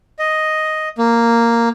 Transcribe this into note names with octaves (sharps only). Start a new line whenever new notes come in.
D#5
A#3